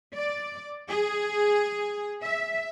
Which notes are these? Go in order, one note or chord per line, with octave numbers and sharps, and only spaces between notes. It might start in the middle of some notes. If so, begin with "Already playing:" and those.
D5
G#4
E5